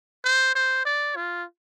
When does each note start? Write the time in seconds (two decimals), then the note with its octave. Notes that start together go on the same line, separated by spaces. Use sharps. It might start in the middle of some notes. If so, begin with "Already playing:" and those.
0.25 C5
0.55 C5
0.85 D5
1.16 F4